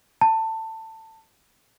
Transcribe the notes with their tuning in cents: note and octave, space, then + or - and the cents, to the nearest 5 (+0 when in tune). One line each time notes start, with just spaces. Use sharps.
A5 +20